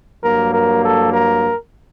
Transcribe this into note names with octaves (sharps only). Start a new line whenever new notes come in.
G2 F#3 A#3 A#4
A#4
A4
A#4